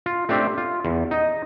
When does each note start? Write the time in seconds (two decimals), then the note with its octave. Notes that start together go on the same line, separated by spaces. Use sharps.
0.06 F4
0.29 A3 C4 D4 G4
0.58 F4
0.85 E2
1.11 D#4 D#5